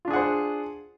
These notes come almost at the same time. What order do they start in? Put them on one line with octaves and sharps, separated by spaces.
F4 D4 G#4 F#5 C5